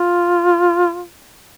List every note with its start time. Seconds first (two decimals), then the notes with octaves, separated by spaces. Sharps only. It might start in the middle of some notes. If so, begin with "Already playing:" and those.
Already playing: F4